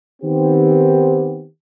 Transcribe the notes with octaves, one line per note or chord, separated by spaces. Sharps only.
D#3 B3 C4 G4